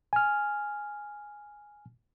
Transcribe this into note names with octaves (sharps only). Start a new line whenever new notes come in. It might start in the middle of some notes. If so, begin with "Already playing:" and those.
G#5 F6